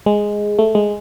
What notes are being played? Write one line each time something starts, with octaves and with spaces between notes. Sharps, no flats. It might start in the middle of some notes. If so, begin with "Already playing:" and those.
G#3
A3
G#3